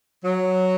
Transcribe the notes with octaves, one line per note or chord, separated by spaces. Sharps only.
F#3